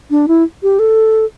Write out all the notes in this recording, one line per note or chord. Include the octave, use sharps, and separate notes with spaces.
D4
E4
G4
A4